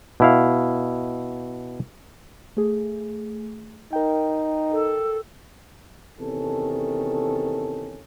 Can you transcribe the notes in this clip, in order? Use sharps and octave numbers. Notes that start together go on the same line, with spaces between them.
B2 E4 F5
A3 G#4
D#4 A#4 G5
A4
E2 C3 D#3 C#4 A4